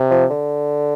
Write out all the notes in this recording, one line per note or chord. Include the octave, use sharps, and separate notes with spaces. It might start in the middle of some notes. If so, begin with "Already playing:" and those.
Already playing: C3
F3
D3